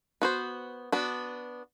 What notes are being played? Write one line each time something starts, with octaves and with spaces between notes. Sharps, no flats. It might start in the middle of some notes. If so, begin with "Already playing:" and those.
B3 F#4 C5
B3 D4 F#4